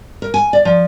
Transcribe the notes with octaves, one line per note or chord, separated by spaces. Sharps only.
A#4
G#5
D5
F3